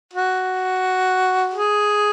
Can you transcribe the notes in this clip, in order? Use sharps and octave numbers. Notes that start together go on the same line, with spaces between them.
F#4
G#4